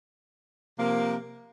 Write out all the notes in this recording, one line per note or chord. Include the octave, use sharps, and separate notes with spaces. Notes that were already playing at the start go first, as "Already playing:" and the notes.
C3 F3 A#3